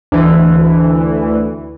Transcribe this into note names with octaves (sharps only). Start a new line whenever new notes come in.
D2 E3